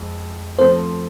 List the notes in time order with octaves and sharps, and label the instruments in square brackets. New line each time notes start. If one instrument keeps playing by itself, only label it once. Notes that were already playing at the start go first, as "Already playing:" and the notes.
Already playing: [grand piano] F2 G#3
[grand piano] F3 A3 C4 [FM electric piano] C5